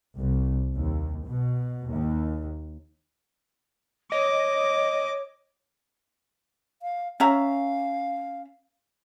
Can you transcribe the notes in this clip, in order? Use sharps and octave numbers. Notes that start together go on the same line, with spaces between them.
C2
D#2
B2
D#2
C#5 D#5 D6
F5
C#4 E5 F5 A#5